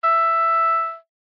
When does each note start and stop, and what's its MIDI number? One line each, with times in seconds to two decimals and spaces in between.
0.04 0.95 76